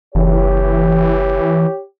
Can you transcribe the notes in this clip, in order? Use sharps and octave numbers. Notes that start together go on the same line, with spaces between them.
F#1 E3 G4 C#5